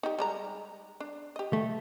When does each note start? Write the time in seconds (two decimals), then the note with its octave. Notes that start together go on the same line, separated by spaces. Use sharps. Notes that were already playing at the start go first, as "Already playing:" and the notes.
0.03 D#4 G4
0.19 G3 G#3 A#5
1.00 D4
1.36 G4 D#5
1.53 A3